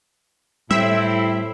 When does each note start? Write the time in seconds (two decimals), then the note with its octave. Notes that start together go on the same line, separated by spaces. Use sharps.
0.71 A2 G3 C4 E4 E5